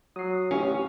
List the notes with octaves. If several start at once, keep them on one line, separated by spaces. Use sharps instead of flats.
F#3 D#6 C7
A1 C#4 E4 F4 G4